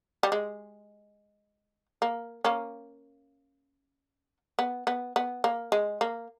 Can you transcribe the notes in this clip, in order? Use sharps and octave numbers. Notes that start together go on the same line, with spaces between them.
G3
G#3
A#3
A#3 C#4
B3
B3
B3
A#3
G#3
A#3